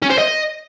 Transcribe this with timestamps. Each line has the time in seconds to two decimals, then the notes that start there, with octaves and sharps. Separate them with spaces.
0.02 C#4
0.10 C5
0.18 D#5